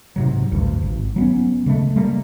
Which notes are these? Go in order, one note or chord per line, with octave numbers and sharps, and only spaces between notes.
G#2 C3 F#3
A1 D2 G2
G#1
F#3 B3 C#4
C#3 G#3 A3
G3 A3 A#3